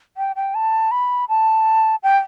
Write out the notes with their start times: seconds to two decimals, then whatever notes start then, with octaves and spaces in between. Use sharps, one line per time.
0.17 G5
0.36 G5
0.55 A5
0.91 B5
1.29 A5
2.03 G5